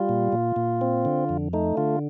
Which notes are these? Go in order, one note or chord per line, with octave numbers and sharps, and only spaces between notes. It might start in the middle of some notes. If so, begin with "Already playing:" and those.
Already playing: G3 F4
A#2
A#2
A#2
C4
D3
F2
A3 D#4
D3 F4